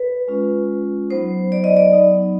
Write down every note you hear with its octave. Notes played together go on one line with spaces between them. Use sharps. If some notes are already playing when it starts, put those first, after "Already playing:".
Already playing: B4
G#3 C#4 F4
F#3 B3 D#4 C5
D5
D#5
D5
F#3 B3 D#4